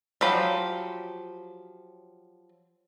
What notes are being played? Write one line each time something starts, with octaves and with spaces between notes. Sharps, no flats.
F3 F#3 G4 B5